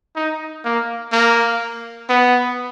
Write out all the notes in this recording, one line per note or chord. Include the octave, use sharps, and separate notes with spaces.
D#4
A#3
A#3
B3